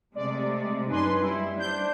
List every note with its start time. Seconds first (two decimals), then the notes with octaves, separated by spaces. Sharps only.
0.15 C3 G#3 A3 D5
0.88 F#2 D4 D#4 B4 G#5 C6
1.21 G3 E4
1.59 D4 C5 G6